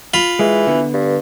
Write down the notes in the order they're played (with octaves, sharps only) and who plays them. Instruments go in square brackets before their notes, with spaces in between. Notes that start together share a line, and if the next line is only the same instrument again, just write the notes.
[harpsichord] F4 B5
[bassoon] E3 [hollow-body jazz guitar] G#3
[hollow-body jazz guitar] D3 B3
[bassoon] G2